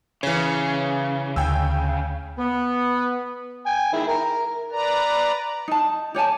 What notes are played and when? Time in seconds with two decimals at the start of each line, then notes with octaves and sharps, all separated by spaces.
0.23 C#3 E3 C#5
1.36 D2 G5 G#5 E6
2.37 B3
3.66 G5 G#5
3.93 D#3 G#3 E4
4.08 A#4
4.71 B4 D5 A#5
5.68 D#4 A5
6.14 G4 C#5 G#5 A5